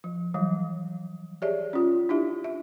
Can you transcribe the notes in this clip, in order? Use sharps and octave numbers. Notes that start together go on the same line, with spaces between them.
F3
E3 F#3 G3
G4 G#4 C#5 D5 E5
C#4 F4
D4 E4 G4 E5
E5